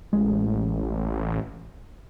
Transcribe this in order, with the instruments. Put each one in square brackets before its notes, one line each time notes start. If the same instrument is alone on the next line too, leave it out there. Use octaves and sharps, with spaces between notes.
[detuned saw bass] A1 [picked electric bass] G#3